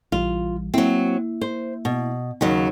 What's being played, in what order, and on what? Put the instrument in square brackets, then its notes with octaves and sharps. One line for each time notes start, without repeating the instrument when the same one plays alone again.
[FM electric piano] A#1 E3 G3 [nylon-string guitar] F4
[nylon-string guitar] F#3 C4 [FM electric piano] A#3 E4 E5
[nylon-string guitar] C5
B2
D#2 C#3 F#3